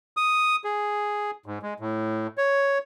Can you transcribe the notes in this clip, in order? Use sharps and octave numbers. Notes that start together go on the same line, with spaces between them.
D#6
G#4
G#2
G#3
A2
C#5